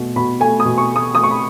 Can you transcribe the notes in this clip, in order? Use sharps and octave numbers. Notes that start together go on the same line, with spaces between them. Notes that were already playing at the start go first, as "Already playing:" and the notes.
Already playing: B2 A3
B2 B5
A3 G#5
D#6
B2
C#6
A3 D#6
A3 D#6
C#6
B5